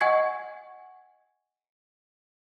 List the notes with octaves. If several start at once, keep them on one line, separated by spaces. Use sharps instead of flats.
D#5 F#5 G#5 C#6 G#6 C7